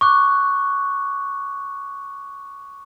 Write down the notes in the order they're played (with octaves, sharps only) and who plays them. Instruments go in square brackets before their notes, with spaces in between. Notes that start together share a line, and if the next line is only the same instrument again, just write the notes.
[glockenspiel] C#6 D6 F#6